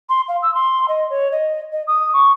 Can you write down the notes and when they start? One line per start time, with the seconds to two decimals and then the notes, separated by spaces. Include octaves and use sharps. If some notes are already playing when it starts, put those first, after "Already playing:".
0.09 C6
0.28 F5
0.42 E6
0.54 C6
0.88 D#5
1.10 C#5
1.32 D#5
1.72 D#5
1.87 D#6
2.13 C#6